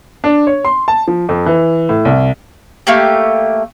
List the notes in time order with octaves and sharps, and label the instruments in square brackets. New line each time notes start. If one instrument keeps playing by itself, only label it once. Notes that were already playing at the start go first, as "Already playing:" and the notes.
[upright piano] D4
C#5
C6
A5
F3
F2
E3
A2
C2
[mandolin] A3 A#3 G4